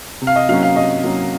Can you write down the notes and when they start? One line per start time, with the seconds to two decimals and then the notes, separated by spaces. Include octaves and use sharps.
0.21 C3
0.27 F5
0.36 D#5
0.49 F#3 A#3 C#4 F5
0.63 F5
0.76 C3 D#5
1.04 F#3 A#3 C#4